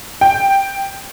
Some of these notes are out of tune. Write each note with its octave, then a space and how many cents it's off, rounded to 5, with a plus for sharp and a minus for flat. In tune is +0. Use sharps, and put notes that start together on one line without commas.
G5 +5